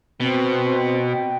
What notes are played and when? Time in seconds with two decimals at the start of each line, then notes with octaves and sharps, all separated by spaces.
0.20 B2 C4
1.12 G5